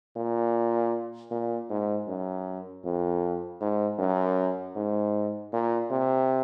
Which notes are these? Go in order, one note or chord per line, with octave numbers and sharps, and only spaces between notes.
A#2
A#2
G#2
F#2
F2
G#2
F#2
G#2
A#2
C3